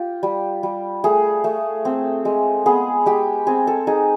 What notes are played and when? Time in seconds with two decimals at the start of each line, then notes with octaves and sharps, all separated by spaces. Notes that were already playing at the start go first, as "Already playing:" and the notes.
Already playing: F4 G4
0.23 G3
0.63 G3
1.04 A3 G#4
1.44 A3
1.85 C4
2.25 G#3
2.66 B3 G#4
3.06 G#3 G4
3.47 C4 G#4
3.67 A4
3.87 D#4 G#4